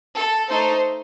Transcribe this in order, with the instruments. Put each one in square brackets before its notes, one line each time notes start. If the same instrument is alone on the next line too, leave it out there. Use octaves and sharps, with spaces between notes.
[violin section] A4
A3 D#4 A4 C5